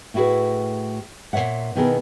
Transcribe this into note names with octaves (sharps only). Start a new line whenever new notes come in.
A2 A3 E4 F#4 G#4 B4
A#2 G#3 C#5 E5 F#5
B2 D#3 B3 E4 G#4 A#4